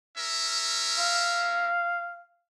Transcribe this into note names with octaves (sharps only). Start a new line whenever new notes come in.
C#4 A#4 E5
F5